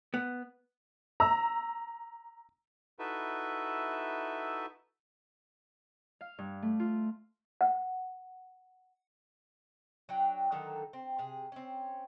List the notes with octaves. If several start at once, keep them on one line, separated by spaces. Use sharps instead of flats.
B3
A#5 E6
D#4 E4 F#4 A4 B4 E5
F5
G2
A3
F4
F#5
F#3 D4 G5
D3 D#3 F#3 A4
C4
C3 G#4
C4 C#4